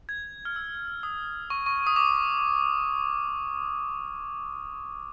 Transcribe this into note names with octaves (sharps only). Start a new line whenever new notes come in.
G#6
F6
E6
D#6
C#6
C#6
D#6
D6